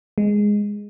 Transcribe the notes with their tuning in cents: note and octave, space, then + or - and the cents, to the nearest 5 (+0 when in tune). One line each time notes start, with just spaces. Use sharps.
G#3 -5